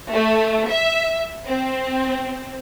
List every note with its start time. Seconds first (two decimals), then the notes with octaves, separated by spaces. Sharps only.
0.12 A3
0.69 E5
1.47 C4